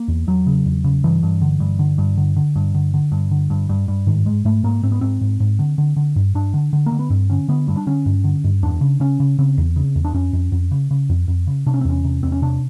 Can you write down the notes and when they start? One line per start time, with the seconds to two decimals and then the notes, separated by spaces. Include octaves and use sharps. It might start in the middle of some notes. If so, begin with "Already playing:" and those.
Already playing: A#3
0.08 E2
0.27 E2 F#3
0.47 C#3
0.66 E2
0.84 C#3
1.04 G2 E3
1.23 G2
1.42 D3
1.60 G2
1.79 D3
1.98 G2
2.17 D3
2.36 D3
2.56 G2
2.75 D3
2.94 D3
3.12 G2
3.31 D3
3.50 G2
3.69 G2
3.88 G2
4.07 G#2 D#3
4.26 G#2 G#3
4.45 G#2 A3
4.64 G#2 A#3
4.83 G#2 C4
4.92 B3
5.01 G#2 C4
5.21 G#2
5.40 G#2
5.59 D3
5.78 D3
5.96 D3
6.16 G2
6.35 G2 D4
6.54 D3
6.73 D3
6.86 A#3
6.92 D3
6.99 B3
7.10 G2 C4
7.30 D3 C#4
7.48 D3 B3
7.68 G2 G3
7.77 D4
7.87 D3 C#4
8.06 G2
8.24 D3
8.44 G2
8.63 E2 D4
8.81 C#3
9.00 C#3 C#4
9.20 C#3
9.39 C#3 C4
9.58 E2
9.76 C#3
9.96 E2
10.05 D4
10.14 F2 C#4
10.33 F2
10.52 F2
10.71 C#3
10.91 C#3
11.10 F2
11.28 F2
11.47 C#3
11.66 C3 D4
11.74 C#4
11.81 C4
11.85 E2 C#4
12.04 C3
12.23 E2 C4
12.32 C#4
12.42 C3 D4